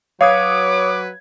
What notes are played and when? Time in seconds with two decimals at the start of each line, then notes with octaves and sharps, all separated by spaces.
0.21 F#3 B4 C#5 F5 D6 D#6 G#6